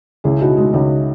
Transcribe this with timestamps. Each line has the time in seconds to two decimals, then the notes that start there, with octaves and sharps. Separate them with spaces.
0.24 C#2 E4 G#4
0.41 B2 D#4 F#4
0.57 G#3 D#4 F#4
0.73 C#2 D#4 F#4